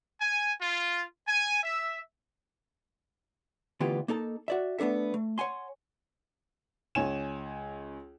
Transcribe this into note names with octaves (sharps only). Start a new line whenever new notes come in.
G#5
F4
G#5
E5
D2 B2 E3 B3 F4 G4
A#3 D#4 A4 A5
F#4 D5 E5
A3 B3 D4 A4 E5
A3
C#5 F#5 G#5 C6
C#2 C#5 G#5 E7